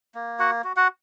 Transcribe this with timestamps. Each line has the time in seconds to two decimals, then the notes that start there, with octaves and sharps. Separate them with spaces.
0.15 A#3
0.39 F#4 F#5
0.64 F#4
0.76 F#4 F#5